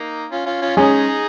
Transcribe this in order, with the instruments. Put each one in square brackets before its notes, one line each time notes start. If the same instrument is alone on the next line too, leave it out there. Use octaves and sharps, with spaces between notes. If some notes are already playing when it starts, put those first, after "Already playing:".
Already playing: [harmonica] A#3 D#4
C#4 F4
C#4 F4
C#4 F4
[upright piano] G#3 C#4 [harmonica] D#4 G#4